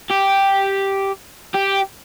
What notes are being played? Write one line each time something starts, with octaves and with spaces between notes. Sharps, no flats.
G4
G4